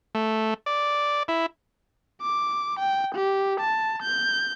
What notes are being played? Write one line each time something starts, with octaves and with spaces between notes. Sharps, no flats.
A3
D5
E4
D6
G5
G4
A5
G6